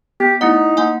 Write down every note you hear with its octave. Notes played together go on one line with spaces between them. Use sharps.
B3 G4
A3 D#4 E4 F#5
A#3 F#5 G#5